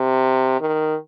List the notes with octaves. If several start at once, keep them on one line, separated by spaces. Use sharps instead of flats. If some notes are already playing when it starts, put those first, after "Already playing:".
Already playing: C3
D#3